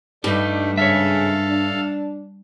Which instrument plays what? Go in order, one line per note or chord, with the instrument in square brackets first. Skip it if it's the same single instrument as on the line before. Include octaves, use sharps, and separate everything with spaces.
[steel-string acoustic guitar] G2 [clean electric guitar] G3 D#4 [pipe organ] A3 D4
[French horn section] G#2 C#3 [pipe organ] A4 F5 [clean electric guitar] C#5 E5
[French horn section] D4